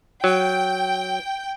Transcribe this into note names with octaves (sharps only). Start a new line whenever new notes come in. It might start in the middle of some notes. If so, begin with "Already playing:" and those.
F#3 G5